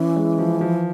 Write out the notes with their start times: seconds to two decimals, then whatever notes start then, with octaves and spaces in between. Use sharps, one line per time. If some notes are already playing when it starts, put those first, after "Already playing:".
Already playing: E3 C#4
0.16 G#3
0.39 F3
0.61 F3